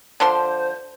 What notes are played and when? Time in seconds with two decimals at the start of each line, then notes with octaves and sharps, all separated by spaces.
0.20 D3 F3 C5 C6